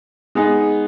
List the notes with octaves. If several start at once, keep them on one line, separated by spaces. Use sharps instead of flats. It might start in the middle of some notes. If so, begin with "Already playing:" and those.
G#3 B3 D#4 G#4